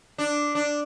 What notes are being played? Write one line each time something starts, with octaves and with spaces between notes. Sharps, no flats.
D4
D4